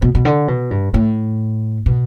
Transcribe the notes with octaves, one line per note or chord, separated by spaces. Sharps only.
B2
B2
D3
B2
G2
A2
B2